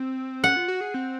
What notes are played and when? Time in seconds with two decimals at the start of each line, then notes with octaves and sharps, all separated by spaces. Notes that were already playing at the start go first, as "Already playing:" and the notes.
Already playing: C4
0.44 C#4 F#5
0.56 F4
0.68 F#4
0.81 G#4
0.94 C4